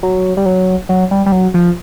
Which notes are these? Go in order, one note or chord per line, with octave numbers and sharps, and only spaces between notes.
F#3
G3
F#3
F#3
G3
G3
F#3
F3